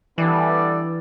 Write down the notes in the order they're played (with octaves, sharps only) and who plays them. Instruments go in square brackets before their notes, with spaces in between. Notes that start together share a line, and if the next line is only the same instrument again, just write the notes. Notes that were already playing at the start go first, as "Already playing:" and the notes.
[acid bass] E3 [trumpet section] G3 B3 D4 A4 D5